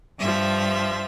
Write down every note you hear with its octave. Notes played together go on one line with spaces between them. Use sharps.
G2 F3 E5